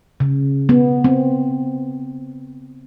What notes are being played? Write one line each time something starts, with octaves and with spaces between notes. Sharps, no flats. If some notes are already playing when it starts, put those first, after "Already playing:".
C#3
B3
C4